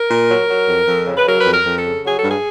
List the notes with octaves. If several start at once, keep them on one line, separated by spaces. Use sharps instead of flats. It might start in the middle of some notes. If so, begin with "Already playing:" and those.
Already playing: A#4
A#2
F#3
F#3
F2
F2
C#3
B4
F#3 A#4
F2 B4
A#4
F2
A4
C#3
F#3 G#4
A4
G2
G#4